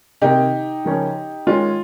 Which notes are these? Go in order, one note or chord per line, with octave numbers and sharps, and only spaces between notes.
C3 D#3 A#3 D#4 G4
C#3 F3 A#3 C#4
D#3 G#3 C#4 F4